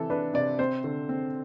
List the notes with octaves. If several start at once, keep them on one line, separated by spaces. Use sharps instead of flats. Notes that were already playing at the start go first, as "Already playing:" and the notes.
Already playing: C3 E3 A4
D4 B4
C3 D5
C4 C5
D3
C4